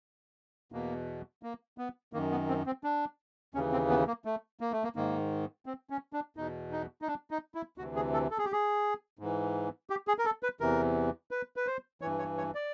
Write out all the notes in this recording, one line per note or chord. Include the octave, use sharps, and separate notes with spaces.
E2 B2 A#3
A#3
B3
F#2 D#3 A#3
B3
C4
C4
D4
D#2 C#3 E3 C#4
C4
B3
A#3
A3
A#3
A3
A#3
G#2 D#3 A#3
C4
C#4
D4
E2 B2 D#4
D#4
D#4
D4
D#4
E4
D2 C3 E3 F#4
G#4
A4
A4
G#4
G4
G#4
G#2 E3
G4
G#4
A#4
A4
B4
E2 C3 E3 A#4
B4
B4
C5
G2 E3 C#5
C#5
C#5
D5